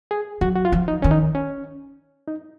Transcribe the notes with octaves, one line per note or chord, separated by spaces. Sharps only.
G#4
F#3 F#4
F#4
F4
F3
D#4
D#3 C#4
D#4
C#4
D#4